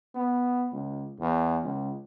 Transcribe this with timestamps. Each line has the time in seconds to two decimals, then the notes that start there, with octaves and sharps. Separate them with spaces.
0.15 B3
0.72 C#2
1.20 E2
1.64 C#2